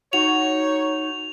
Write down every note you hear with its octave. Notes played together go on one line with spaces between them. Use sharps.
D#4 F#4 C#5 F7